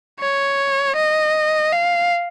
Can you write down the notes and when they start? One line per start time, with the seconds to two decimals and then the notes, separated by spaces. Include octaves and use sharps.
0.21 C#5
0.96 D#5
1.72 F5